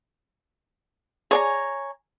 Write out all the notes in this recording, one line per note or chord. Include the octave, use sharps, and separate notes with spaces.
G#4 C#5 D5 G#5 A#5